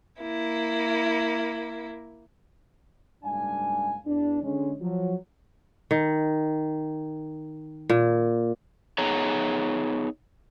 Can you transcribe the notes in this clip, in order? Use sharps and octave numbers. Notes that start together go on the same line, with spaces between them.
A#3 E4
F#1 G#2 G3 D4 F5 G#5
E2 D4
D3 G#3 C#4
F3 F#3
D#3
A#2
B3 D#4 G#4 C#5 A#5